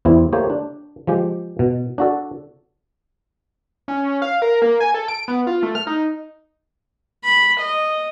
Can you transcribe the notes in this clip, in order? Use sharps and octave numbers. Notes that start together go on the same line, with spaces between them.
E2 G3 C4 E4
A3 A#3 G4 A4 C5 C#5
D4
F3 G#3 G4
B2
D4 F#4 A4
C#4
F5
A#4
A#3
G#5
A4
D7
B3
F4
A3
F6
D#4
B5
D#5